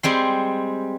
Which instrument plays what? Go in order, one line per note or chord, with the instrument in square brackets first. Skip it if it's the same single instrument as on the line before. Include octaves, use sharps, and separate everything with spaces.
[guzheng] G3 G#3 C4 C6